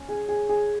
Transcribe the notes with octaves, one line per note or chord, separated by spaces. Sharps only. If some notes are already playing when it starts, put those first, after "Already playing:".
Already playing: C#4
G#4
G#4
G#4